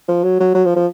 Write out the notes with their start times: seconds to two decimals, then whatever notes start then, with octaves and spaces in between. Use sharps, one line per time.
0.08 F3
0.24 F#3
0.40 F#3
0.55 F#3
0.66 F3
0.76 F3